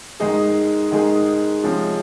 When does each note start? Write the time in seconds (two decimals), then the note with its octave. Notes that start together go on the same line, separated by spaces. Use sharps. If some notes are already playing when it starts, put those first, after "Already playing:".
0.20 G#2 D#3 G#3 D#4 G#4
0.91 G#2 D#3 G#3 D#4 G#4
1.64 C3 F3 G#3 C#4